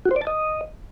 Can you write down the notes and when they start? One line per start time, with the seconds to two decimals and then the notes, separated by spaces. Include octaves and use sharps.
0.05 F#4
0.11 C5
0.16 D5
0.21 A5
0.27 D#5